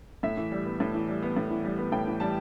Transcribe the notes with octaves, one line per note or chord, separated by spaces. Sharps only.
A2 E5
E3
G3
B3
A2
E3
G3
B3
A2
E3
G3
B3
A2 G5
E3
G3 A5